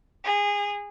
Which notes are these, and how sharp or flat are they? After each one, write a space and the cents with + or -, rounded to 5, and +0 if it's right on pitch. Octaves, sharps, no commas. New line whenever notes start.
G#4 -25